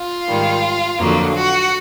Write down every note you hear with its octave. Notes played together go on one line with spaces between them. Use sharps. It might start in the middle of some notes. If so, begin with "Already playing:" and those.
Already playing: F4
G#2 D#3 G3
F2 D3 F#3 A#3
F#4